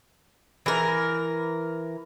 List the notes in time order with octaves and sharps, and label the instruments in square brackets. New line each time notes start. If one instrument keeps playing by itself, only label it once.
[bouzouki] E3 A#4